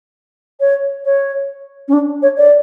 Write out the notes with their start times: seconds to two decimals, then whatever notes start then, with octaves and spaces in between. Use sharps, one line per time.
0.60 C#5
1.05 C#5
1.88 C#4
1.93 D4
2.22 C#5
2.37 D5